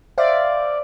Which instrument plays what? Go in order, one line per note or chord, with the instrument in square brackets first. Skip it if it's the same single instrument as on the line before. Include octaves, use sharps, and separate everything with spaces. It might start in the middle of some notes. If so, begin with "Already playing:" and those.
[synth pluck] C5 E5 F5 [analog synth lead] D5